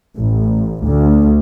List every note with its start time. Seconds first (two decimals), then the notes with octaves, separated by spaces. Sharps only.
0.18 A1
0.86 D2